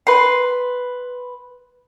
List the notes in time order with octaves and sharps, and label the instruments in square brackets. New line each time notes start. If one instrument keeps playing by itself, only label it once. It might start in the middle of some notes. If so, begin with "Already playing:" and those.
[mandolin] B4 C6